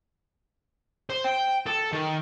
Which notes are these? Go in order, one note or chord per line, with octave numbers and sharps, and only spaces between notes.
C5
G5
A4
D#3